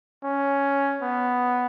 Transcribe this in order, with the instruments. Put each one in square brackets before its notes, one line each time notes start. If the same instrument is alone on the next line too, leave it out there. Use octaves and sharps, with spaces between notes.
[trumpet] C#4
B3